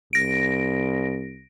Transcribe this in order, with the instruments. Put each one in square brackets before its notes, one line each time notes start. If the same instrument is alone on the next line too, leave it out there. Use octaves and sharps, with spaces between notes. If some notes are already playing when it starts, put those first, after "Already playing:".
[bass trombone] C2 [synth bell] A#6 D7